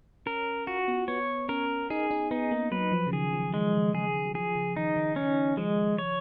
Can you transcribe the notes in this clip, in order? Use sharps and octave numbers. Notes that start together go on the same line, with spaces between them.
C#4 A#4
F4 F#4
B3
B3 C#5
C#4 A#4
D#4 G#4
D#4
B3 D#4
A#3
F#3 B4
F3
C#3
D#3 G#4
F3
D#3 G#3
C#3
C#3 G#4
D#3
F#3
F3 G#4
C#3
D#3 D#4
D#3
D#3 C#4
F3 G#3
C#5